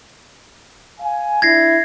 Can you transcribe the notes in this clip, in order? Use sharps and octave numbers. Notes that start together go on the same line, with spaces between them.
F5 G#5
D4 E4 G#6 A#6 C7